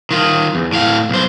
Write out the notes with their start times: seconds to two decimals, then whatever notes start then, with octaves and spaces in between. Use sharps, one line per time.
0.11 D#3 F4
0.55 E2
0.73 A2 F5
1.09 B1 C5